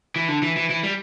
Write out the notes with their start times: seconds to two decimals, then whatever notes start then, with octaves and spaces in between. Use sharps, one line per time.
0.16 E3
0.28 D3
0.42 E3
0.57 E3
0.70 E3
0.83 G3